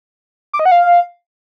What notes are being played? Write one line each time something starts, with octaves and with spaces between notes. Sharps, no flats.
D6
D#5
F#5
F5